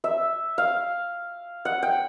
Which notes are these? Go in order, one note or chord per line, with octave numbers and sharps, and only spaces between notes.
E5
F5
F#5
G5